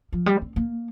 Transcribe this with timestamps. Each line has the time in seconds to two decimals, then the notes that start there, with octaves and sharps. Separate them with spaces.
0.13 F3
0.26 G3
0.42 C4
0.56 A#3